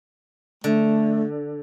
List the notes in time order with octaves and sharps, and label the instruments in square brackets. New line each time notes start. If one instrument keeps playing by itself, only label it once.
[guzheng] D3 [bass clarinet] A3